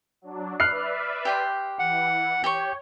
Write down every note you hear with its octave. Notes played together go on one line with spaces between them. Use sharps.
F#3 D4
B4 D5 E5 F6 F#6 C7
G4 G5 C6
E3 F#5
G4 C#5 G5 C#6